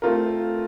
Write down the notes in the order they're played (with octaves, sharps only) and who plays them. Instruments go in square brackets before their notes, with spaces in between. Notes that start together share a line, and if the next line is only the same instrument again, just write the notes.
[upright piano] A3 C4 F4 A#4